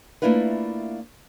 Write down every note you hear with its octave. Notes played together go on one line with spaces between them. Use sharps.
A3 A#3 D4 E4 F4 B4